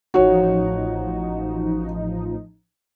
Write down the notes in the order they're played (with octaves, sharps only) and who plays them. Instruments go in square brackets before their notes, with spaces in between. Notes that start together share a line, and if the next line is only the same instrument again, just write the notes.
[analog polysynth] A1 F3 D#4 [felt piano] F#4 C#5